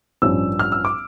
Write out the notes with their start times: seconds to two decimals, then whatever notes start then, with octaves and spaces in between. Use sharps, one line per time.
0.22 A1 G2 F3 C#4 E6
0.59 F6
0.72 E6
0.85 D6